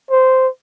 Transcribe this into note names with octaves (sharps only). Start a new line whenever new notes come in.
C5